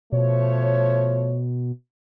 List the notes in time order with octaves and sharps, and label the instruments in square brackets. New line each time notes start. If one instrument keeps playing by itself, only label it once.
[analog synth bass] B2 [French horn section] F3 A3 C#5